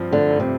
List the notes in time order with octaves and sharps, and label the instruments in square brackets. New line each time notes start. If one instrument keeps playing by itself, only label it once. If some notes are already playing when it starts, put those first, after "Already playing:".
Already playing: [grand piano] G2 F3 C4
[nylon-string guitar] D3 [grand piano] A3
[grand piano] G2
[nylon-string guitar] C3